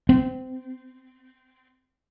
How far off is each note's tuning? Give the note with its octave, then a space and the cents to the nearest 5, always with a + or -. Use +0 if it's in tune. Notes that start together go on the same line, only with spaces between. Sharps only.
C4 -20